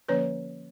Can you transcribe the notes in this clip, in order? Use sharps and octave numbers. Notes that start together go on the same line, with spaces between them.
D3 F3 A#3 C#4 B4 C#5